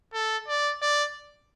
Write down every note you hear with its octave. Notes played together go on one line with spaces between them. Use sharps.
A4
D5
D5